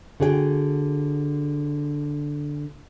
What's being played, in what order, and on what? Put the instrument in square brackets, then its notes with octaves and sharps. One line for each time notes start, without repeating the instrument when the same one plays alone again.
[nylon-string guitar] D3 F#4 G#4 C#5 G5